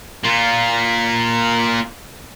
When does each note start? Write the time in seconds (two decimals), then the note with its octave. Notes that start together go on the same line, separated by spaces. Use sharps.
0.24 A#3 F4